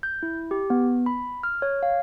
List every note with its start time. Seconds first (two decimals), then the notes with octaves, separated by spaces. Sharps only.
0.03 G6
0.23 E4
0.51 G4
0.70 B3
1.06 B5
1.43 F6
1.62 C#5
1.83 F5